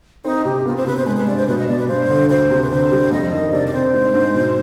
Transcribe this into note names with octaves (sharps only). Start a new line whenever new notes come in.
C4 D#4
C3 G4
B3 F4
C4
C3 B4
C5
G#3 B4
B4
G2 D5
C5
B2 B4
D#5
B2 D5
B4
G2 C5
D3
D2 C5
C3
B4
D3 C5
G3
F2 D#5
D#3
C3 D5
D5
C4 C5
G#2
G#2
B2